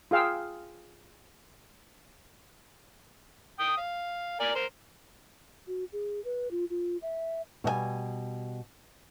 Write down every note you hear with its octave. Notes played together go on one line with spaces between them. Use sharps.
F4 G#4 F5 G5 E6
G5 D#6
F5
A#4 D5 G#5
A#4 C5
F#4
G#4
B4
F4
F4
E5
B2 G3 D#5 G#5